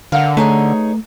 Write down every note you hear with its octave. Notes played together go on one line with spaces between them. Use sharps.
D3 A#4 F5 F#5
A3 D#4 G#4 B4 C#5 A#5